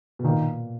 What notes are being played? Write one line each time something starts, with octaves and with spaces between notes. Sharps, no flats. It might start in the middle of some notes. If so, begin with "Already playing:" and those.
B2
A#2 D#3